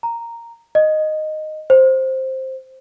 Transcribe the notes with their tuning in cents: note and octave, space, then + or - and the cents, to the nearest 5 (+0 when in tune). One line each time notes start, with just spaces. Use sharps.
A#5 -5
D#5 -5
C5 +5